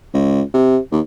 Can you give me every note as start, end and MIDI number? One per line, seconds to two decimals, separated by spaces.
0.14 0.42 37
0.54 0.78 48
0.91 1.00 39